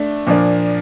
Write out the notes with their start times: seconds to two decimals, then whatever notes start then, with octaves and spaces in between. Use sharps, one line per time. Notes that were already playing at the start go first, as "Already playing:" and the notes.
Already playing: A3 D4
0.27 A#2 F3 A#3 D4